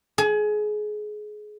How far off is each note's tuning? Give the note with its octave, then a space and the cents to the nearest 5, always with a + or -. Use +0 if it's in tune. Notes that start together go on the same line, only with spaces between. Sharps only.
G#4 +25